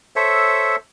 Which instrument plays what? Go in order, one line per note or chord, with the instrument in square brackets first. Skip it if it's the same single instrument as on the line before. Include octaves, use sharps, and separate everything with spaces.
[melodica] A4 C5 C#5 E5